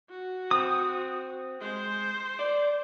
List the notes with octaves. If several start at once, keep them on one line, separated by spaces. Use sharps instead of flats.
F#4
C4 D#6
G#3 C5
D5